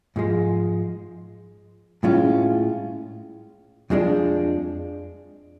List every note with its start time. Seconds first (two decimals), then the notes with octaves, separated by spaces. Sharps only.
0.16 G#2 F3 G#3
2.03 A2 G#3 C#4 F4
3.90 F2 F3 G#3 D4